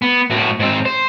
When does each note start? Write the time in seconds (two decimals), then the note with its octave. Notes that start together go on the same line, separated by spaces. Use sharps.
0.02 B3
0.30 A2 F#4
0.60 G#2 C4
0.85 C5